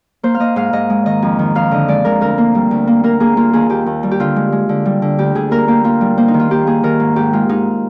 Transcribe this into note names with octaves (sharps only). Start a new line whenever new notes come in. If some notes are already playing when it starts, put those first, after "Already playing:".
A#3 C5
F5
A#3 D#5
G#2 F5
G#2 D#5
G#3
D#3 D#5
F2
D#3
F2 F5
D3 D#5
G#3 D5
G#3 A#4
D2 A#4
A#3
G3
D2
A#3
A#3 A#4
A#3 G#4
A#3 F4
D#2 G#4
D#2 G4
D#2
G3
G4
D3 F4
G#3
G#3
D3
G3
D3
D2 G4
D3 G#4
A#3 A#4
A#3 G4
A#3 F4
G3
A#3 C5
D#4
D#3
F4
A#3 G4
A#3 G#4
D#3 A#4
G#2
G#2 G4
G#3 F4
G#2 D#4